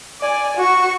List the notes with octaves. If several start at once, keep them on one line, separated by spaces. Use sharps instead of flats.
D5 G#5
F#4 C#6